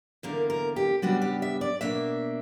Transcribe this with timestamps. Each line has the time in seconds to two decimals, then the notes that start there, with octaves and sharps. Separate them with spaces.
0.23 E2 D3 A#3 A#4
0.50 A#4
0.76 G4
1.02 C#3 G3 B3 D4 F#4
1.22 G4
1.42 E5
1.61 D5
1.81 B2 A#3 D4 E5